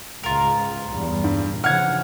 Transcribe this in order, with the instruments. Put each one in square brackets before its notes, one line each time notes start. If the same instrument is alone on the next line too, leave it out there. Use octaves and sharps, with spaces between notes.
[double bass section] C#2 G#2 [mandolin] F4 A#4
[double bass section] E2 G2
[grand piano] G2 [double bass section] A#2
[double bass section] C#3 E3 F3 [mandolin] F#5 [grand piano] F6 G#6